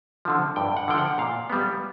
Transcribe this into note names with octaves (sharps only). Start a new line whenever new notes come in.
D3 F3
G2 G5
F#5
D3 F3 G5
F#5
A#2 F5
G3 B3